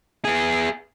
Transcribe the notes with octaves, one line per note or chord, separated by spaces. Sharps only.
B3 G#4